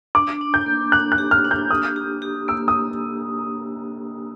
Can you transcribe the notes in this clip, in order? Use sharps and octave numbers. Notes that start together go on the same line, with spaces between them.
D4 D6
D4
G6
A#3
D4 F#6
F#6
G4
F6
D4
G6
D4 D#6
G4
G4
A#3 E6
D#6